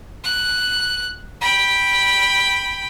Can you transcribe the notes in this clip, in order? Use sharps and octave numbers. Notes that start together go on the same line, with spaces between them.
F#6
G5 B5